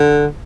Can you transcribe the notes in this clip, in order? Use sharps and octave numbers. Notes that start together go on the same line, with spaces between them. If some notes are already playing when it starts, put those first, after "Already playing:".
Already playing: D3